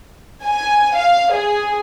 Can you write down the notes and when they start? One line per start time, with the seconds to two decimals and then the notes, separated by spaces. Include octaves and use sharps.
0.44 G#5
0.96 F5
1.33 G#4